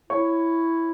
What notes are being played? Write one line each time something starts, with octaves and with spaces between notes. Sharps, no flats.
E4 C#5